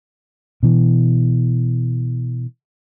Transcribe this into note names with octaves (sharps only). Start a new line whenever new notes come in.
B2 E3